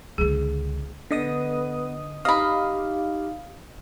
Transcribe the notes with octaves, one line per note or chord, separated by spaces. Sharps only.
C#2 D3 G#4
D3 B3 D#5 D#6
D#4 G4 D#5 F5 B5